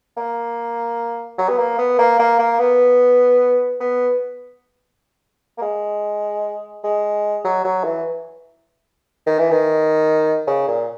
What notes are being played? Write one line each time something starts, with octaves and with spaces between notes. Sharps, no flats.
A#3
F#3
B3
A#3
B3
A#3
A#3
A#3
B3
B3
A#3
G#3
G#3
F#3
F#3
E3
D#3
E3
D#3
C#3
A#2